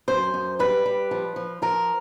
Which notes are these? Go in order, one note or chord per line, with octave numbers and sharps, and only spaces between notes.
F#2 C5
F#2
G3 B4
G3
F3
F3
F3 A#4